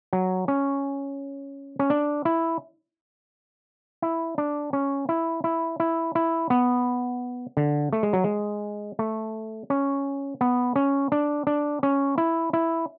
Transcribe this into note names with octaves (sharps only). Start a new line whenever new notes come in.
F#3
C#4
C#4
D4
E4
E4
D4
C#4
E4
E4
E4
E4
B3
D3
A3
G#3
F#3
G#3
A3
C#4
B3
C#4
D4
D4
C#4
E4
E4